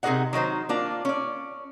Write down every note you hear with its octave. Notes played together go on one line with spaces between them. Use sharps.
C3 D#4 G#4 A#4 D#5 F#5
D#3 F#3 D#4 C5
A#3 D4 F4
C#4 D5